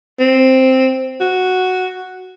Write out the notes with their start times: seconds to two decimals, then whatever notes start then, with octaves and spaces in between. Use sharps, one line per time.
0.19 C4
1.21 F#4